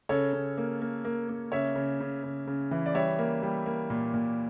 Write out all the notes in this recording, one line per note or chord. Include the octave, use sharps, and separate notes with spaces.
C#3 A4 C#5
C#3
A#3
A#3
A#3
A#3
C#3 C#5 E5
C#3
C#3
C#3
C#3
E3
D5
G3 C#5 E5
A#3
G3
A#3
A#2
A#2